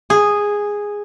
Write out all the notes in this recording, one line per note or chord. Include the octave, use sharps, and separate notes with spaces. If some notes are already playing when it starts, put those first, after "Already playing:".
G#4